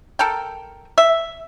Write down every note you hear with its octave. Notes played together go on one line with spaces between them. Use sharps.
A4 A#4 G5
E5